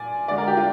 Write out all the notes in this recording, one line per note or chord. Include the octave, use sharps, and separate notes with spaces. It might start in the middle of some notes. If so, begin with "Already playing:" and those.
Already playing: A#2 D5 G#5
D3 G#3 D5
A#4
G4
F4